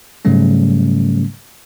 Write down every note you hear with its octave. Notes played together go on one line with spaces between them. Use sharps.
G#2 C#3 F#3 G3 A3 C#4